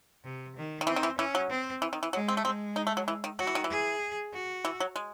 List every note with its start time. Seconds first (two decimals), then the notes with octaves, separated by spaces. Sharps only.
0.24 C3
0.56 D#3
0.81 D#3
0.87 E3 C4
0.96 D#3
1.03 E3
1.19 E3 C#4
1.35 F#3
1.50 C4
1.82 E3
1.93 D#3
2.03 E3
2.13 F#3 G#3
2.28 C4
2.37 A3
2.45 G#3 C4
2.76 D#4
2.87 A3
2.97 F#3
3.08 E3
3.24 D#3
3.39 F#3 F#4
3.47 E3
3.55 D#3
3.64 E3
3.70 G#4
4.33 F#4
4.65 E3
4.80 F#3
4.96 G#3